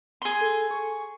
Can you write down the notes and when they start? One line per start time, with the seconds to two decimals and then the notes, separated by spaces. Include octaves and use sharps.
0.22 G#4 C6
0.41 A4
0.71 C#6